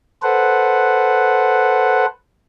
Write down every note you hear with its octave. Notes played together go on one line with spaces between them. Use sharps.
A4 B4 C5 F#5